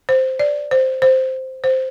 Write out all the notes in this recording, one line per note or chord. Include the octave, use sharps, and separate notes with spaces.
C5
D5
C5
C5
C5